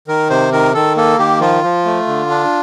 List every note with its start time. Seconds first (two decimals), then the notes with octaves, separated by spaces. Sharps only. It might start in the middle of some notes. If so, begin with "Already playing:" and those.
0.08 D#3 A#4
0.30 C3 C5
0.52 D#3 A#4
0.74 D#3 A4
0.97 A#3 A4
1.19 D#3 G4
1.40 F3 F4
1.63 F3
1.85 A3
2.07 D3
2.30 D4